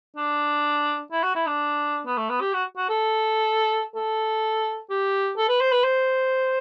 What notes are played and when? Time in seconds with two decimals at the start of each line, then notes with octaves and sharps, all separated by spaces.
0.17 D4
1.12 E4
1.23 F#4
1.36 E4
1.47 D4
2.06 B3
2.17 A3
2.29 B3
2.41 G4
2.53 F#4
2.77 F#4
2.89 A4
3.96 A4
4.90 G4
5.38 A4
5.49 B4
5.60 C5
5.72 B4
5.84 C5